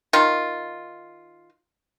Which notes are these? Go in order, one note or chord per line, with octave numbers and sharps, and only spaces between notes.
D#3 F4